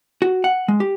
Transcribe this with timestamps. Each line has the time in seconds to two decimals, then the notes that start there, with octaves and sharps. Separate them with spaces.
0.22 F#4
0.44 F#5
0.68 G#3
0.80 G4